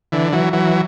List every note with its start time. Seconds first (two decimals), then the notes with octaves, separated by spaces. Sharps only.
0.12 D3 E3
0.33 E3 F#3
0.53 E3 F#3